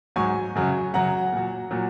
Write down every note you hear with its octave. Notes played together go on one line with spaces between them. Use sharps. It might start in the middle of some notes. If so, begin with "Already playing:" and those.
G#2 F#3 G#5 C#6
F#2 C#3 F#3
F#2 C#3 F#3 F#5 A#5
A#2 F#3
A#2 F#3